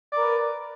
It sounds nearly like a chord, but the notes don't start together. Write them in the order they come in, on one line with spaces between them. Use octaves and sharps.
D5 A#4 B4